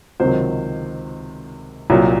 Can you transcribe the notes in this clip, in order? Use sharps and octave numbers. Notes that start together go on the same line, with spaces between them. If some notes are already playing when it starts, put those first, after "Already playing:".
C#2 C3 D#3 F#3 C5
C2 A#2 F#3